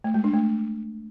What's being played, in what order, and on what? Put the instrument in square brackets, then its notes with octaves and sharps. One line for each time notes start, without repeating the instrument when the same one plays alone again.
[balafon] A3
G#3
D4
A3